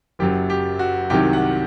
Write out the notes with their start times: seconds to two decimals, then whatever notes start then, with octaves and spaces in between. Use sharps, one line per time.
0.19 F#1 F#2 F#3 G4
0.50 G4
0.79 F#4
1.10 C2 C3 D#3 F#3 G4
1.33 F#5